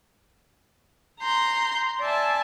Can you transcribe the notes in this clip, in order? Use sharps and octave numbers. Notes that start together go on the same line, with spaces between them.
A#5 C6 G6
D5 E5 G#5 A5